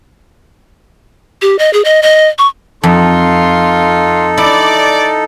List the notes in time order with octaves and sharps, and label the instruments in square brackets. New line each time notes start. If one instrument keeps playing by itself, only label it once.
[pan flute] G4
D#5
G#4
D#5
D#5
C#6
[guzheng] F2 [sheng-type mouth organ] D#4 A4 [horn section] F4 C6
[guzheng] E4 [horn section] D5